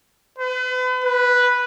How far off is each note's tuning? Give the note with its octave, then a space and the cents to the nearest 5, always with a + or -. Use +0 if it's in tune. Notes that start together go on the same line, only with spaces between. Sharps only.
B4 +40
B4 -5